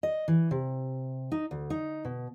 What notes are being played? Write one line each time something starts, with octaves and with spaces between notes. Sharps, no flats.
D#5
E3
C3
D#4
D2
D#4
B2